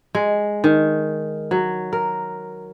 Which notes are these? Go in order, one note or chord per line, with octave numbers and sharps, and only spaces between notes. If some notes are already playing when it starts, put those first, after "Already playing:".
G#3
D#3
F#3
A#4